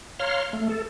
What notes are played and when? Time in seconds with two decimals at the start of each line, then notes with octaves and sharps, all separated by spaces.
0.20 C#5 F5 A#5 C6 F6
0.53 A3
0.69 A4